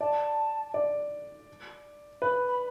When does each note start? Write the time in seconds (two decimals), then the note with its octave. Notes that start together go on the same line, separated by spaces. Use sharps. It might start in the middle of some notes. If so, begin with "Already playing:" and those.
0.01 D5 A5
0.74 D5
2.22 B4 B5
2.48 B5